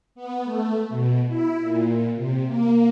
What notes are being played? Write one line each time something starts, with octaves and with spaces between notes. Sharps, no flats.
B3
A3
B2
E4
A#2
C3
A#3